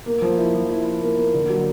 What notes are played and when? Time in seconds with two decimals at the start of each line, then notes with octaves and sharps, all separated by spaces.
0.06 A#3
0.22 F3
0.38 E4
0.54 F3
0.71 E4
0.86 E4
1.02 A#3
1.18 A#3
1.34 D3
1.50 F#3